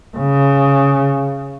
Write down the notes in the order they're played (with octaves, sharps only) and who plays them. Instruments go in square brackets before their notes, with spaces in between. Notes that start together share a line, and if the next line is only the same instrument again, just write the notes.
[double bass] C#3